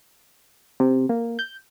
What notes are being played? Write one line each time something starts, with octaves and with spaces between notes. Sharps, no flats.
C3
A#3
G6